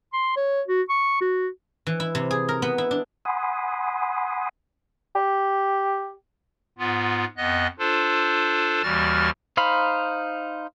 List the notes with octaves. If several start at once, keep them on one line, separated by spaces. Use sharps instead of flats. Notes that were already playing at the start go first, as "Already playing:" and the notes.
C6
C#5
F#4
C#6
F#4
E3
E4
C3
G#4
A#4
B3
E4
D4
F#5 G#5 B5 C6 D#6
G4
G#2 B3 F4
F2 B3 D#5 F#6
D4 F4 A4 C5
D#2 E3 G3 F#4 F6 A6
D#4 C5 F5 B5